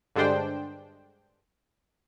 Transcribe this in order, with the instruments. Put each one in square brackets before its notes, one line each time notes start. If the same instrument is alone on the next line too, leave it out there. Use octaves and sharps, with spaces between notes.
[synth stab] G2 D3 G#3 D4 C5 G5